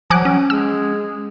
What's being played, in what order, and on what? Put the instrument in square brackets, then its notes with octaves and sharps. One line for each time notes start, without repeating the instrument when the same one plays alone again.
[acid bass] F3 [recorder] F#3 [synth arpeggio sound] G#5 D6 F#6
[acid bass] C#4
[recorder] G#3 [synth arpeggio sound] E6